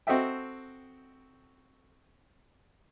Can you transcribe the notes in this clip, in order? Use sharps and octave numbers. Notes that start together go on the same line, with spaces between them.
C4 F#4 A4 D#5 E5 G5